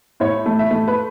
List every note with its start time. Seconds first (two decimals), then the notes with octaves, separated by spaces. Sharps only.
0.20 A2 C#5
0.46 A3
0.59 E5
0.71 A3
0.88 B4